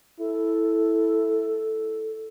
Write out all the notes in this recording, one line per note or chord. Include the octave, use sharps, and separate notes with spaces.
E4 A4